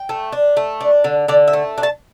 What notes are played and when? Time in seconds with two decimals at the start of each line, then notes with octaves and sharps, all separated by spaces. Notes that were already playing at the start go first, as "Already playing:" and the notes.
Already playing: G5
0.09 A3
0.32 D4
0.57 A3
0.81 D4
1.04 D3
1.28 D3 D5
1.48 E5
1.53 A3
1.78 D4
1.83 A5